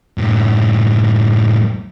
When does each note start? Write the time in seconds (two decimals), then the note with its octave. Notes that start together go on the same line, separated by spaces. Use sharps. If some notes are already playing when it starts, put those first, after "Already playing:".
0.18 F#2 A2